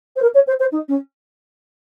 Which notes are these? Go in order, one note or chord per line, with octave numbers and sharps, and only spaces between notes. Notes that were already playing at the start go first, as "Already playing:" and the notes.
C5
A#4
C#5
C5
C5
D#4
C#4